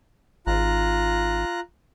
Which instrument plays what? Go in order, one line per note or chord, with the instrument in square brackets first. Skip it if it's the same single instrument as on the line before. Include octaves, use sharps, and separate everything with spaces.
[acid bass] G#1 [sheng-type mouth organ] F4 A#5 F#6